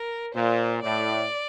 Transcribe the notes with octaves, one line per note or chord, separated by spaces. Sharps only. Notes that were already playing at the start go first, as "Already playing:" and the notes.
Already playing: A#4
A#2 C5
A2 D5